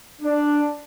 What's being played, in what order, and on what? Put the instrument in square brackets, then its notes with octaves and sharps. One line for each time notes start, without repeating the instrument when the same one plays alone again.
[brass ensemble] D4